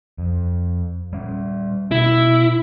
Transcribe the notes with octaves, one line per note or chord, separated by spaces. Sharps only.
F2
G3 C#4
B2 E4